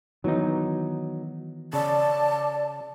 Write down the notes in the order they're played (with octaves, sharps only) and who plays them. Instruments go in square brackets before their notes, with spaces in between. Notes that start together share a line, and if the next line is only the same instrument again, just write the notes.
[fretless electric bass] D#3 E3 B3 [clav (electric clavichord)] F#3 D#4
[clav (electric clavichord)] C#3 [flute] D5 [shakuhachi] A5